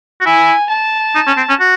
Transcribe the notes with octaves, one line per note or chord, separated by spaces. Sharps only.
F#4
E4 G#5
A5
D#4
C#4
C4
C#4
F#4